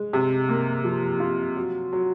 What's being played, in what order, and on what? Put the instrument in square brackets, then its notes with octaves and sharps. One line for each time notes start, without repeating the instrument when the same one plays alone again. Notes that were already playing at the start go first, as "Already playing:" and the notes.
Already playing: [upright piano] G#3
C3
A#3
F3
F4
F#3
F#3